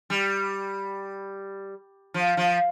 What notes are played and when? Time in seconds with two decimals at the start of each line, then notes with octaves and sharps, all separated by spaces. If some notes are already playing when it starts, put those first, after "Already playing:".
0.10 G3
2.14 F3
2.37 F3